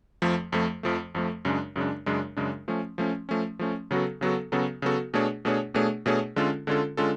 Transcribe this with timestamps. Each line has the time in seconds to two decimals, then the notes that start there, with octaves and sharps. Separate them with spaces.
0.22 F2 F3 A3
0.52 F2 F3 A3
0.83 F2 F3 A3
1.15 F2 F3 A3
1.45 F#2 C#3 G#3 D4
1.76 F#2 C#3 G#3 D4
2.06 F#2 C#3 G#3 D4
2.37 F#2 C#3 G#3 D4
2.68 F3 A3 C#4
2.98 F3 A3 C#4
3.29 F3 A3 C#4
3.59 F3 A3 C#4
3.91 C#3 F#3 B3 F#4 A4
4.21 C#3 F#3 B3 F#4 A4
4.52 C#3 F#3 B3 F#4 A4
4.82 C#3 F#3 B3 F#4 A4
5.14 B2 A3 D4 G#4 C#5
5.45 B2 A3 D4 G#4 C#5
5.74 B2 A3 D4 G#4 C#5
6.06 B2 A3 D4 G#4 C#5
6.36 D3 G#3 C#4 F4 A4
6.67 D3 G#3 C#4 F4 A4
6.97 D3 G#3 C#4 F4 A4